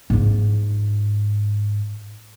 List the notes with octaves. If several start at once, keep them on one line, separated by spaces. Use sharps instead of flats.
G#2 F4